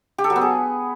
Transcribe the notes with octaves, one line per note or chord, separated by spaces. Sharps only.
G4
A4
F#3
B3
G#4